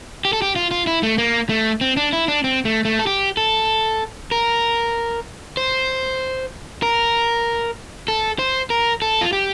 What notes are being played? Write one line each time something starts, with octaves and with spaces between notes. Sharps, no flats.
G4
A4
G4
F4
F4
E4
A3
A#3
A3
C4
D4
E4
D4
C4
A3
A3
A4
G4
A4
A#4
C5
A#4
A4
C5
A#4
A4
F4
G4